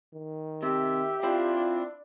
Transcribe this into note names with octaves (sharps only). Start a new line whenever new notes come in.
D#3
C3 G4 E5
C4 D4 E4 F4